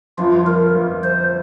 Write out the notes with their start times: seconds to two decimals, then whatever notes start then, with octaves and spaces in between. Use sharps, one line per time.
0.18 G1 F2 F3 F4
0.46 A#4
0.75 G1 F2 F3
1.03 C5